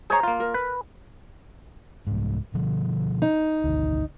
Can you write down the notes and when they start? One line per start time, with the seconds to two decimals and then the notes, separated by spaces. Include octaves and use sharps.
0.10 G#4 C5 C#5 A#5
0.23 A#3 F4
0.40 A#4
0.54 B4
2.07 C2 G#2
2.54 B2 D3 F3
3.22 D#4
3.64 G#1 D2